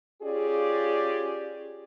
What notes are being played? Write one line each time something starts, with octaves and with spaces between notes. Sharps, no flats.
C#4 F4 G4 G#4 D5